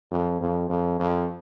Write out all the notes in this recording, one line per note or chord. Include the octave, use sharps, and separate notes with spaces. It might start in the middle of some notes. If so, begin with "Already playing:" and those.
F2
F2
F2
F2